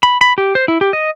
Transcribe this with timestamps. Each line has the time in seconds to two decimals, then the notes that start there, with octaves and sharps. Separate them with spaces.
0.03 B5
0.21 B5
0.38 G4
0.55 C5
0.68 E4
0.81 G4
0.93 D#5